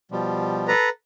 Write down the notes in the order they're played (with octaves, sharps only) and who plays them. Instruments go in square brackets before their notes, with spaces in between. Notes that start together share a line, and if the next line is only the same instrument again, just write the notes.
[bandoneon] B2 F3 G3
[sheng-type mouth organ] A4 B4 A#5